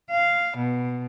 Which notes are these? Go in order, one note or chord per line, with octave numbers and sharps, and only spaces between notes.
F5
B2